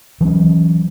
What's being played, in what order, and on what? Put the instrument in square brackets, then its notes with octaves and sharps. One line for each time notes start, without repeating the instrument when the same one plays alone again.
[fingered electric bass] E3 F#3 B3 C#4